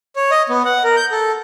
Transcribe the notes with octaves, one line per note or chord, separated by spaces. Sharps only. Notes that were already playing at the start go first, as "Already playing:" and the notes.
C#5
D#5
B3
F#5
A#4
G6
A4